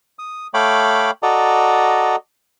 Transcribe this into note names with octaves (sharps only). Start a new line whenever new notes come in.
D#6
A3 C#5 F5 G5 B5 D6
F#4 A4 D5 D#5 A#5